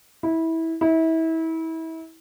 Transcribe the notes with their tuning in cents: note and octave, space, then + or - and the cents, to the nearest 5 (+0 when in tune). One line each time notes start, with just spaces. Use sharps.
E4 -20
E4 -30